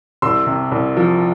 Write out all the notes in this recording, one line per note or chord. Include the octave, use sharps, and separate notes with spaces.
C2 C6 E6
C3
C2
F3